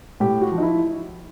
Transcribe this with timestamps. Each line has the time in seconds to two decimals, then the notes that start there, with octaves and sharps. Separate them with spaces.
0.20 A2 G4
0.41 F#4
0.52 F3
0.58 D#4
0.62 E4